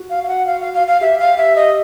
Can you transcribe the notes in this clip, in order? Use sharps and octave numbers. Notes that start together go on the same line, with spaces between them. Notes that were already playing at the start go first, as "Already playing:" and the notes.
Already playing: F#4
F5
F5
F#5
F5
F5
F5
F5
G4 E5
F5
E5
D#5